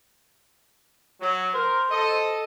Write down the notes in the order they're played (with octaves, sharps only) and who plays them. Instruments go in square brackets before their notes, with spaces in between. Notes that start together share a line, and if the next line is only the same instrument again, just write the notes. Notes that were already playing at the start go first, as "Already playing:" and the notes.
[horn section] F#3
[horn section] A#4 [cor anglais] C5
[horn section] A4 D#5